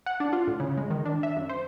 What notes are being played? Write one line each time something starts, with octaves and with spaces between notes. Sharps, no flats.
F#5
D4
F4
A2
C#3
G#3
D#3
D4
E5
F#2
C5